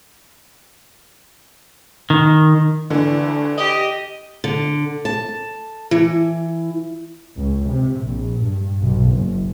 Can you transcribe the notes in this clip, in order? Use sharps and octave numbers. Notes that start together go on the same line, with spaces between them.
D#3
D3 E3 D4
G4 D#5
D3
A5
E3
C#2
C3
A#1
G2
B1
F#1